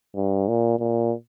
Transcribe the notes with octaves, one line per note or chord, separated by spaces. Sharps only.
G2
A#2
A#2